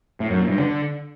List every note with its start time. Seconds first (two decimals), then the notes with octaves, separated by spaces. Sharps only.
0.20 A2
0.30 F#2
0.40 A#2
0.50 G2
0.60 D3